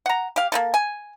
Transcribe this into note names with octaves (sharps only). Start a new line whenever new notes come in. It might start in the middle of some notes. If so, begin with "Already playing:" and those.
F#5 A#5
G4 F5
A#3 D#4 A4
G#5